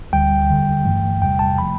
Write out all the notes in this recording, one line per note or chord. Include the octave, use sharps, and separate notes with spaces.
D2 D3 G3 G5
E2 D3 G3
G2 E3 A3
E2 C3 G3 G5
A5
F3 A3 B5